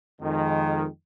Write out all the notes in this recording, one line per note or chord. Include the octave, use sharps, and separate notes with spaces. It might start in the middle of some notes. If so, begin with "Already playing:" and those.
F2 D#3 G#3